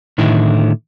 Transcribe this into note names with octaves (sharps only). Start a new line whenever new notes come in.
A2 D3 D#3 E4